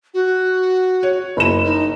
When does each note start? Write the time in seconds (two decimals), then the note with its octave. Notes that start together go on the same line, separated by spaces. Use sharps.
0.14 F#4
1.03 C#5
1.37 F#1 B5 E7
1.64 D#4